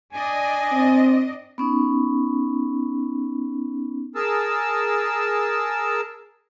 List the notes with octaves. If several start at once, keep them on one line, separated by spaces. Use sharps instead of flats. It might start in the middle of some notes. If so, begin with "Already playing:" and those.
D4 D5 D#5 G#5
C4
B3 C#4 D#4
G#4 A#4 A5 E6